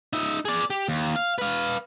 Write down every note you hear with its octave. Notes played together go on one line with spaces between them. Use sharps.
D#4 E5
G#4 D5
G4
D#2
F5
B4 F5